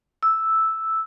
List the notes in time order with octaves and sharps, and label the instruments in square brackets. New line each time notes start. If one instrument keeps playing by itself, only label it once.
[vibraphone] E6